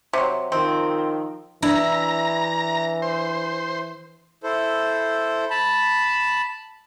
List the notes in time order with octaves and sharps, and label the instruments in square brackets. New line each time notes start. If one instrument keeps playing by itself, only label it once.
[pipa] C3 F#3
[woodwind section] D#3 F3 [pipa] C4
[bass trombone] E3 [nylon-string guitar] D4 [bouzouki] E4 [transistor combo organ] A#5
[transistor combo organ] C5
[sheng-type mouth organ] E4 A4 C5
A5 B5